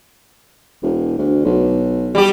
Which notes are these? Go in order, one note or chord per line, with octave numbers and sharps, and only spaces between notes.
E1
D2
B1
G3 G4